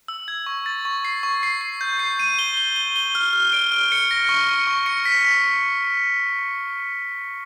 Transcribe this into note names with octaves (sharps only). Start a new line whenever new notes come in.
E6
G#6
C#6
A6
C#6
C7
C#6
C7
C7
G6
C7
D#7
G7
G7
G7
G7
F6
F6
D7
F6
C#7
A#6
C#6
C#7
C#6
C#7
B6
B6